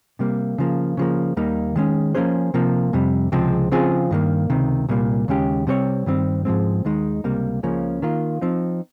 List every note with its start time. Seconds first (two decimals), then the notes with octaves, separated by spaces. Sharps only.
0.19 C3 G3 A#3
0.58 C#3 F3 A#3
0.97 C#3 F3 A#3
1.37 D#2 D#3 G3 A#3 D#4
1.76 D#3 G#3 C#4
2.15 F3 A#3 C#4 G#4 C5
2.54 C3 F3 A#3
2.93 F2 C3 G3
3.32 C#2 C3 F3 G#3 C4
3.71 C#3 F3 C4 F4 G#4
4.11 G2 D#3 A#3
4.50 C#2 C3 D#3
4.89 C2 A#2 G3 A#3
5.28 D#2 C#3 G#3 C#4 G4
5.67 C3 G3 C4 G4 C#5
6.06 G2 D#3 G3 C4
6.45 G#2 F3 G#3 C4
6.85 D#2 D#3 G#3 D#4
7.24 C#2 C3 G3 A#3
7.63 C#2 C#3 F3 A#3 C#4
8.02 D#3 A#3 F4
8.41 F3 C4 D#4